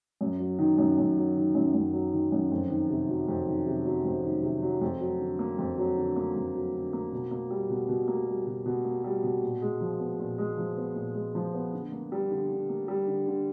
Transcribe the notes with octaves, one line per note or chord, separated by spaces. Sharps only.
F#2
F#3
D#3
F#2
F#2
F#3
D#3
F#2
F#2
F#3
D#3
F#2
F2
D#3
C3
F#3
F2
D#3
C3
F#3
F2
D#3
C3
F#3
F2
F#3
D3
A#3
F2
F#3
D3
A#3
F2
F#3
D3
A#3
B2
A#3
G3
B2
B2
A#3
G3
B2
B2
A#3
G3
B2
A#2
G#3
F3
B3
A#2
G#3
F3
B3
A#2
G#3
F3
B3
D3
A#3
G3
D3
D3
A#3
G3
D3
D3